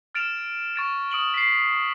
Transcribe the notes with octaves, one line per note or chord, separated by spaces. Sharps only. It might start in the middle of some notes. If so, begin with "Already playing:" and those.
F6 A6 D7 E7 F7
C#6 A6 D7
D#6 D7 F#7 G7
B6 C7